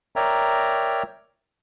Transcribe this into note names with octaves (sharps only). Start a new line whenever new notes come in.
A#4 C#5 D5 E5 G5 A#5